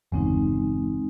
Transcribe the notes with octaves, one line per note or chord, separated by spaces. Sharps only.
G1 E2 C#3 G#3 C4 D#4